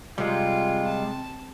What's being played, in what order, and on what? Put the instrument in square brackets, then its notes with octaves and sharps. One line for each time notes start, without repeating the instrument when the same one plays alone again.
[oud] C3 [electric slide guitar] G3 G#3 [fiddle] F4
[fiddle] A5